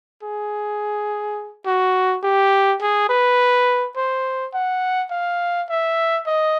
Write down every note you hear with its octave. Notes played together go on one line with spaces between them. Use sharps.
G#4
F#4
G4
G#4
B4
C5
F#5
F5
E5
D#5